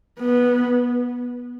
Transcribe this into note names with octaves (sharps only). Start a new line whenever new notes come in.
B3